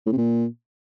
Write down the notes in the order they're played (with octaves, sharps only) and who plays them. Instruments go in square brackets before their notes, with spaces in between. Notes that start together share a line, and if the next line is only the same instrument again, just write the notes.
[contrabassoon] A2
C3
A#2